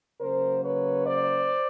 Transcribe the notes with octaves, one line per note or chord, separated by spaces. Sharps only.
C#3 F#3 A#3 A#4 C5
B4 C#5
C5 D5